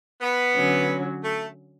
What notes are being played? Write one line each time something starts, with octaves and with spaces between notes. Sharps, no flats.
B3
D3 F#3 C#4
A3